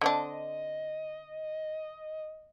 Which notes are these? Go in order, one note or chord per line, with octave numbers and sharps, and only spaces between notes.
D3 C4 D4 D#5